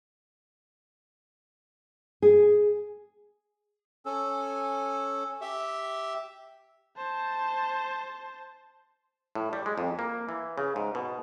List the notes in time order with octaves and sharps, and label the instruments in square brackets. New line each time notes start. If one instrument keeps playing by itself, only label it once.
[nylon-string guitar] G#4
[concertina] C#4 A4
G4 E5
[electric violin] C5 A5
[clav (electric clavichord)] A2
G3
G#3
F2
A#3
E3
C#3
G#2
B2